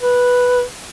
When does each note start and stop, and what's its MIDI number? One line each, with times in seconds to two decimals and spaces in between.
0.01 0.63 71